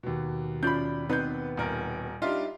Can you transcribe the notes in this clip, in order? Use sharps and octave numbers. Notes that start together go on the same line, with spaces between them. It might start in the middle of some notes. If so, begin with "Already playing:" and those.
D#2 B2
C#4 F4 D5 B5 G6
B3 C4 D#4 B4 G6
D#1 A#4
G3 D4 D#4 F4 D#5 E5